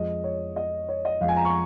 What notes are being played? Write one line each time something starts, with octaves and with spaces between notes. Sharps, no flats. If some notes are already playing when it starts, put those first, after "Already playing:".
Already playing: F2 F3 G#3 D#5
C#5
D#5
C#5
D#5
F2 F3 G#3 F5
G#5
A#5
C#6